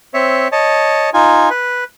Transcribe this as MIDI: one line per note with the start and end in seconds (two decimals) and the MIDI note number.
0.14 0.48 60
0.14 0.48 73
0.14 0.48 76
0.52 1.10 73
0.52 1.10 75
0.52 1.10 81
1.14 1.49 63
1.14 1.49 65
1.14 1.49 80
1.50 1.84 71